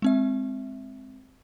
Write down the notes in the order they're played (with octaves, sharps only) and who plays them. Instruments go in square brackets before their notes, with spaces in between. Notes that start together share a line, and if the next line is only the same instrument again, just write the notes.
[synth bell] G#3 C4 E5